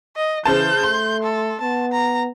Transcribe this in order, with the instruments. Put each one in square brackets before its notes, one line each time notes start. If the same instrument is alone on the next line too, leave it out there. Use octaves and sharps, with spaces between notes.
[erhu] D#5
[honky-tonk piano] C#3 C5 A5 [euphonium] E3 [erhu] G6
[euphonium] A3 [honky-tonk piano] C6
[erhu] A4
[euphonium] B3 [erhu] A5
[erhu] A#5